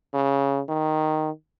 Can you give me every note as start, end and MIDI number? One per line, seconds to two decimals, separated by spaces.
0.14 0.61 49
0.69 1.30 51